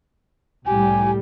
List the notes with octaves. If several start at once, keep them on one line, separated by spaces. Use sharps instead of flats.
C2 A2 G3 G4 G#5